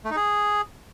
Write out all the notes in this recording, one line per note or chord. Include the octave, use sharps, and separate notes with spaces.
A3
D#4
G#4